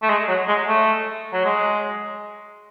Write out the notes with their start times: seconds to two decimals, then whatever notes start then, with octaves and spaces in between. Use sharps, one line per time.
0.02 A3
0.09 G#3
0.28 F#3
0.48 G#3
0.68 A3
1.33 F#3
1.45 G#3